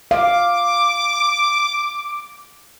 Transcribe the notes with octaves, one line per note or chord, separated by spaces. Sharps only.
F5 D6